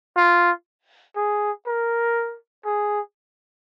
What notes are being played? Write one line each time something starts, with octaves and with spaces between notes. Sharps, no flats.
F4
G#4
A#4
G#4